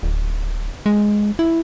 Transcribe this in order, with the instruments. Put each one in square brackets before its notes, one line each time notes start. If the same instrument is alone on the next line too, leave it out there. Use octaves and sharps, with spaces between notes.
[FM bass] D1
G#3
E4